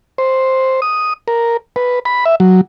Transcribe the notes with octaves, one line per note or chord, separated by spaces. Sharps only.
C5
D#6
A#4
B4
B5
E5
F#3